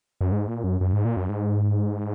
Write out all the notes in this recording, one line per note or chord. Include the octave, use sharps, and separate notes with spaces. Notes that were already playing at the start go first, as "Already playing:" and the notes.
F#2
G#2
A#2
F#2
F#2
G#2
A#2
F#2
G#2